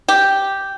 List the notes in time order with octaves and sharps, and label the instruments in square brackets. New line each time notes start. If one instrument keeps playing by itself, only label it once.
[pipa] G4